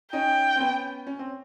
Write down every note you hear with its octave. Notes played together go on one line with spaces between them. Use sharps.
C#4 D#4 G5
C4
B3 C#4
C#4
C4